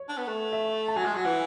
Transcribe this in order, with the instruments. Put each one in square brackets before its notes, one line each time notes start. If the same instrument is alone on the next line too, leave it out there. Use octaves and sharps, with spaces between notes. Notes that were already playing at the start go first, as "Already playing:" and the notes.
Already playing: [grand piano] C#5
[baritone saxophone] D4
B3
A3
[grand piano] E5
A5
[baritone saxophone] F#3 [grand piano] G#5
[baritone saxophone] G#3
F#3
[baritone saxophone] E3 [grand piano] F#5